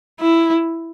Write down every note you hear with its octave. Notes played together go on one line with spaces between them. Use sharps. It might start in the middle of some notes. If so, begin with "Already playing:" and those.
E4